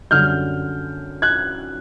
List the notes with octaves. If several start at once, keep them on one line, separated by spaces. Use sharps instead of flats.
F#2 D3 G3 F6 G6
F#6 G#6